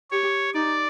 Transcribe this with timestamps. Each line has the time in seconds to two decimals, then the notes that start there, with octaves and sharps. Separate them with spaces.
0.11 G4 C#5
0.54 D#4 D5